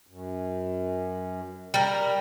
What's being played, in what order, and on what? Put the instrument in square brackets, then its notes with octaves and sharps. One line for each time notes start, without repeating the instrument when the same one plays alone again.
[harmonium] F#2
[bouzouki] G3 A#4